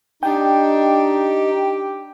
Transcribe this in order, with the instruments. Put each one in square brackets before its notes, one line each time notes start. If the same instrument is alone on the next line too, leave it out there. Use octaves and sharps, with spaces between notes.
[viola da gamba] D4 [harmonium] D#4 [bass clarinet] G4 [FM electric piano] G5